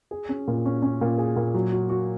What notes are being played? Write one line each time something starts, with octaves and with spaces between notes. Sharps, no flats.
G#4
C#4
A#2
C#4
C#4
A#2
G#4
A#2
F#3
F#4
F#4